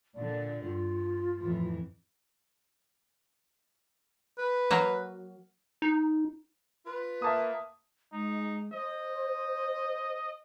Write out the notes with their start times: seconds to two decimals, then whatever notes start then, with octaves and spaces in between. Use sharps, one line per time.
0.15 A#2 D3 D5
0.64 G2 F4
1.39 F2 A2 E3
4.38 B4
4.71 F#3 A#3
5.82 D#4
6.85 F4 B4
7.22 A#3 E5 A5 D#6
8.13 G#3 D#4
8.73 C5 D#5